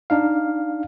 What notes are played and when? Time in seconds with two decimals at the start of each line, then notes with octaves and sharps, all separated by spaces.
0.10 D4 D#4 F5